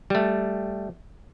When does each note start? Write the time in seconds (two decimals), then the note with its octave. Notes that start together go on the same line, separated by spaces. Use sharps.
0.10 G3 A3